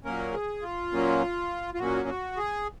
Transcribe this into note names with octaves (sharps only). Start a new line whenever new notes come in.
A#2 F#3 A#3 C#4 A#4
G#4
F4
A#2 F#3 A#3 C#4
F4
A#2 F#3 A#3 C#4 F#4
F#4
G#4